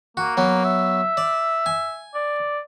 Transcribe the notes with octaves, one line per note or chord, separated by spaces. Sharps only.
A#3 F#4
F#3 B3
E5
D5
G#5
D5